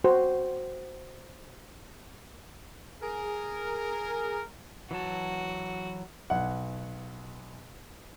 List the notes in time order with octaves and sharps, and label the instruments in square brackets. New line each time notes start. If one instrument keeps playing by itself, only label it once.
[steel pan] F#4 C5
[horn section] G#4 A#4
[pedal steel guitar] E3 F#3 A5 [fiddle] F#4
[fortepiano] B1 F#5